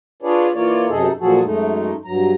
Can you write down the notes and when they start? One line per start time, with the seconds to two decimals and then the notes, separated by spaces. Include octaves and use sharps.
0.23 D4 F4 G#4 B4 C#5 D5
0.54 E3 A#3 F4 C#5 D5
0.89 F#2 C3 D#4 G#4 A4
1.20 A#2 F3 F#3 F#4 G#4 A4
1.43 F#2 G#3 A3 D#4
2.05 G2 F#3 A#5